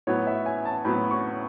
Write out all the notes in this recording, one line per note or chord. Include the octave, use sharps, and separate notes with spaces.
A2 F#3 B3 C#5
E5
G#5
A5
A2 F#3 B3 B5
C#6